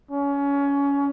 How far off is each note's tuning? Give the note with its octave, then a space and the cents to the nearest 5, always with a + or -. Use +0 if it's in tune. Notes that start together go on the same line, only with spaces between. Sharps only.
C#4 +25